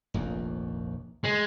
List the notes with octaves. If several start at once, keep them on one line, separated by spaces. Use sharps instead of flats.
F1 A#1 D#2
G#3